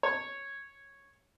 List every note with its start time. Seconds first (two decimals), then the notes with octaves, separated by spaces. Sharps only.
0.03 C#5